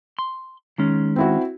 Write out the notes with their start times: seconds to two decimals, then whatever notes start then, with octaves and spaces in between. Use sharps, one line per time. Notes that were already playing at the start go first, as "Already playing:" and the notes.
0.19 C6
0.78 D#3 G#3 C#4
1.16 C4 E4 F#4